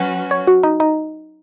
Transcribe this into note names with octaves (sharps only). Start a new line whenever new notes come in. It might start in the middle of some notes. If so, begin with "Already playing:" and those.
Already playing: F#3 C#4 F#4 B4
C#5
F#4
D#4
D#4